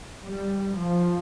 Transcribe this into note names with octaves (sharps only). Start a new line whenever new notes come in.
G3
F3